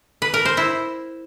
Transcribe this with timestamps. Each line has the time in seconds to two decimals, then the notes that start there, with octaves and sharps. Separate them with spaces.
0.22 B4
0.34 A#4
0.45 C5
0.57 E4